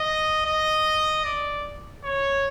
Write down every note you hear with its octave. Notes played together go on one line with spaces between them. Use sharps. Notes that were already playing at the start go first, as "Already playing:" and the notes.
Already playing: D#5
D#5
D5
C#5